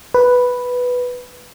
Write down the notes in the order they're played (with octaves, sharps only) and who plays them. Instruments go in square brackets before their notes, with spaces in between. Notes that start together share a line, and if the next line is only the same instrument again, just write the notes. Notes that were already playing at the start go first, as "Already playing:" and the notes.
[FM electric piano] B4